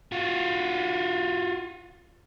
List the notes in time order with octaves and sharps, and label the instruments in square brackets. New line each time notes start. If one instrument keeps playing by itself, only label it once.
[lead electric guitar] F4 F#4